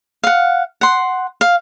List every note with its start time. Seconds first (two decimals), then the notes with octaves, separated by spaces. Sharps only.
0.24 F5 F#5
0.81 F#5 C6
1.41 F5